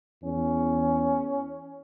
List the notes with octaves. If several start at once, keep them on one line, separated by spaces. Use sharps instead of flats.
E2 C#4